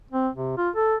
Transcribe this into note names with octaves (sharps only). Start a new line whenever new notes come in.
C4
C3
F4
A4